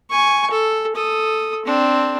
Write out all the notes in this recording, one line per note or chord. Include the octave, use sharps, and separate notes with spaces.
G#5 C#6
A4
A4 D#6
C4 D4